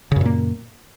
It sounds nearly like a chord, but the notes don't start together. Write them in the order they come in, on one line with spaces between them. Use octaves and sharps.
C#3 F#2 A#2 A#3